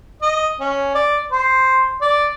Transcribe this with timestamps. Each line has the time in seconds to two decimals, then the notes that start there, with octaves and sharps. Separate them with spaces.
0.22 D#5
0.61 C#4
0.95 D5
1.32 C5
2.02 D5